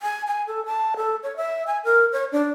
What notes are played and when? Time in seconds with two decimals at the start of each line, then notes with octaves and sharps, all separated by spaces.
0.02 G#5
0.27 G#5
0.47 A4
0.66 A5
0.97 A4
1.23 C#5
1.36 E5
1.67 G#5
1.84 A#4
2.13 C#5
2.32 D4